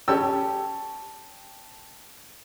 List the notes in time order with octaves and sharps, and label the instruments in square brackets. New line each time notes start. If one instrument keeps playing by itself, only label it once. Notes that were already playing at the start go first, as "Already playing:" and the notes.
[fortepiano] C#4 G4 E6 [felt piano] G5 A5